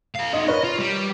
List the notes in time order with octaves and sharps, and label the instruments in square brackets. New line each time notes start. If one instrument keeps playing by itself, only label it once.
[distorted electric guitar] A4 F5
[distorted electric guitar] D#4 F#4 [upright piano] D#5
[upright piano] A#4 B4 C#5 [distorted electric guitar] D#5
[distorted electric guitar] F4
G3